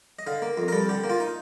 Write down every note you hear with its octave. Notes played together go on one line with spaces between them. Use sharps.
D#5
D3 F5
A#3
F2
A#4
G3 A4
D3 G4
A#3
F4
D#4